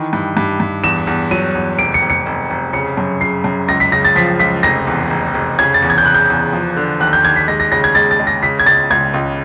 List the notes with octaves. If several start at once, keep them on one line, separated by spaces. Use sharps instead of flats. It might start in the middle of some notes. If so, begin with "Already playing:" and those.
Already playing: D#3 E3
G2
G2
G2
E2 E7
E2
F#3 D#7
E2
F1 D7
C#7
F1
C#7
F1
F1
C#3 C#7
F#2
C#3 C7
F#2
C#2 A#6
B6
C#3 A#6
A6
F3 B6
C#2 B6
F1 A#6
E2
F1
F1
C#3 G#6
A6
E2
G#6
G6
C#3 F#6
G6
E2
F3
D3
D#2 F#6
G6
D#2 G#6
B6
G#3 A#6
A#6
C#3 A#6
G#6
G#3 A6
A6
G#3
A#6
C#3 B6
G#6
C#2 A6
C#2 G#6
C#2